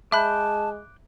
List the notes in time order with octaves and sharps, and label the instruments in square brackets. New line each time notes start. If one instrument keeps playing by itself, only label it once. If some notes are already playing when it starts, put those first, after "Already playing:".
[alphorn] G#3 [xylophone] E5 B5 [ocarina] A5 [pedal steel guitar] D6 F#6 G6